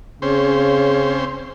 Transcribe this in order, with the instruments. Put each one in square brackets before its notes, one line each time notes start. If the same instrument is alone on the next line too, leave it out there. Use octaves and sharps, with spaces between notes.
[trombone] C#3 [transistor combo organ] C4 C#4 C5